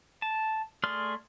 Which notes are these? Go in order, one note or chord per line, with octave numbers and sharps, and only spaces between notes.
A5
A3 G#4 D5 C6 F6